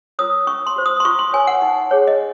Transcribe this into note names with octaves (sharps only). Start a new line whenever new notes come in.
F4 A#4 C#5 D#6
C#4 C#6
C6
F#4 C5
D#6
C6
F4 C#6
C6
A#4 C#5 G#5
F#5
D#4
G#4 C#5
D#5